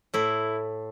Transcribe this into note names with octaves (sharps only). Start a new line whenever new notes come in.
A2 E4